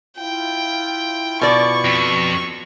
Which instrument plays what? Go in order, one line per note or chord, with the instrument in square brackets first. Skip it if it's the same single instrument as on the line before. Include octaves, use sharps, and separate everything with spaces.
[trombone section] E4 F4 [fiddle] G5
[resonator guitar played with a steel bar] B2 D5 [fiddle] C#6
[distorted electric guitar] F2